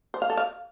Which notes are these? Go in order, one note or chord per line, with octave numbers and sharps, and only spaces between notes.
C5
F5
A4
F5